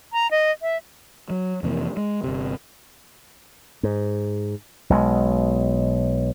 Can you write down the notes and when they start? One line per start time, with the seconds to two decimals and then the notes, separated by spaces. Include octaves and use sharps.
0.13 A#5
0.31 D#5
0.62 E5
1.30 F#3
1.63 F2 C3 E3 A#3
1.97 G#3
2.24 G1 C3
3.83 G#2
4.90 B1 B2 G#3